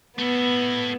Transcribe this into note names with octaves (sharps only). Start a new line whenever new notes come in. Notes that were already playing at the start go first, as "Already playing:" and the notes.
A3 B3 E4